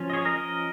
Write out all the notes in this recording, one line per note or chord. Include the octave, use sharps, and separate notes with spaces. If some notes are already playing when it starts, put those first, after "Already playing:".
Already playing: F3 C#4
D#5
G#4 C#5
A#4 D#5
A#4 D#5